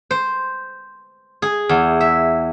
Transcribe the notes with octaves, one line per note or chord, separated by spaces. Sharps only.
C5
G#4
E2
E5